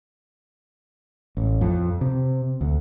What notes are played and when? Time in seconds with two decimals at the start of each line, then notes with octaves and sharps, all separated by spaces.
1.37 A1
1.61 F2
2.01 C3
2.61 D2